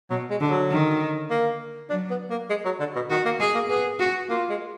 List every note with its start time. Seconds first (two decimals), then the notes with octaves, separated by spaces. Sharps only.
0.10 B2 F#3
0.30 G#3
0.40 D3
0.50 F#3
0.70 D#3
1.30 A#3
1.90 F#3 D4
2.11 B3
2.30 A#3
2.50 G#3
2.65 F#3
2.80 D3
2.96 B2
3.10 D#3 F#4
3.25 A#3
3.40 G#3 G#4
3.55 A#3
3.69 B3 G#4
3.99 F#4
4.29 A#3 F4
4.50 G#3